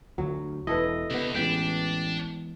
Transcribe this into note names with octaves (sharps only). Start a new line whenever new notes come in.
D2 F#3
E1 E4 A4 B4 D#5
D2 C3 B3
A1 E3 G#3 B3 D4 G5 B6